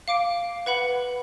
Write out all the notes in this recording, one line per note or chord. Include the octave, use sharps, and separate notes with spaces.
F5 D6 D7
B4 F#5 B5